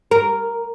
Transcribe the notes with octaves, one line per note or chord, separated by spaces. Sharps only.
A#4